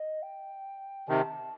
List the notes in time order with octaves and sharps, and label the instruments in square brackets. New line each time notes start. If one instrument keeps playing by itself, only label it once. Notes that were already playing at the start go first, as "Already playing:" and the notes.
Already playing: [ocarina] D#5
G5
[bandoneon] C3 D#3 [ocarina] A5